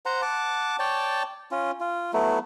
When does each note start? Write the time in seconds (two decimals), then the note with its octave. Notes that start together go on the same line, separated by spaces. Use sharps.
0.06 C5 F#5 A#5
0.22 F#5 A5 D6
0.79 C#5 D5 G5 A5
1.51 C#4 F4
1.80 F4
2.13 F#3 A3 B3 E4